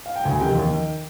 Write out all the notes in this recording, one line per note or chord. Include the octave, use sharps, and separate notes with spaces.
F5
G5
D2 G#5
C3 D#3 G5
D#2
D#3